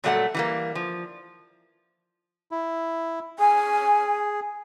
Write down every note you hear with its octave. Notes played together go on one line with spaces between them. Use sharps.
A#2 F#3 G3 A3 E5 F#5
E3 G3 A#3
F3
E4
G#4 G#5